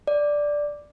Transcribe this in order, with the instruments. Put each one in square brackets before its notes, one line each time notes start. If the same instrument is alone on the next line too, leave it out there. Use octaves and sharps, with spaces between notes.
[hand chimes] D5